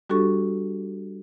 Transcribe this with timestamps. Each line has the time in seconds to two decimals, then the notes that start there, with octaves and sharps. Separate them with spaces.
0.10 G3 D4 F#4 G4 A4 C#6